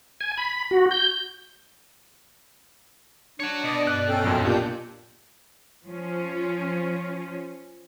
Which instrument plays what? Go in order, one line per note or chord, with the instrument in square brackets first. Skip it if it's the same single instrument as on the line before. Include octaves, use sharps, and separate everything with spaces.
[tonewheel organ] G#5
B5
F#4
G6
[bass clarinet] D4 [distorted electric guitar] C#5 F#5
[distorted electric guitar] B2 [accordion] D5 D#5 D6
[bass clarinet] G2 [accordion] D5 [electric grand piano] F#6
[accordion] C#4 A4 G5
[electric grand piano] A#1 F#2
[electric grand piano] A#2 [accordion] D4 G6 [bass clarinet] G4
[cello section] F3 C#4